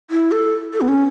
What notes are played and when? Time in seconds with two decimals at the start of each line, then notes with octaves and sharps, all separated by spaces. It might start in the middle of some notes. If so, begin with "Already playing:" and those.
0.11 E4
0.32 A4
0.73 A4
0.81 B3
0.88 C#4